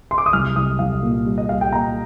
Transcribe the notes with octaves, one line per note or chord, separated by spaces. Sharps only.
C6
D6
D#6
C2 F6
C2 D#6
C2 F5
A#2
G3
D#5
G3 F5
G5
A#2 A#5